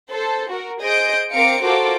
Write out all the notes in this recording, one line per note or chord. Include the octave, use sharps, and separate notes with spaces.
A4 C5
F#4 A#4
G#4 C5 D#5 G6 D7
C4 A#4 F5 D6 C#7 D7
F4 F#4 A4 A#4 C5 D6